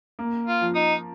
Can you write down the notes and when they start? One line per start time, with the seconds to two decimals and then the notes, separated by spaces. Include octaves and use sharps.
0.19 A#3
0.47 F4
0.61 F3
0.75 D#4